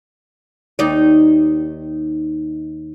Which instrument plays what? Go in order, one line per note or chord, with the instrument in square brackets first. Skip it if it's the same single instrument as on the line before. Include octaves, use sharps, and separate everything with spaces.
[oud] D#2 D#4 D5